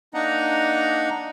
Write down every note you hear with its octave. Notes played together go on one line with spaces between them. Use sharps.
A#3 D4 D#4 D#5 F#5 A#5